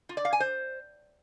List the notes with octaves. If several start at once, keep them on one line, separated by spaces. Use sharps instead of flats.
F4
D5
F5
G#5
C5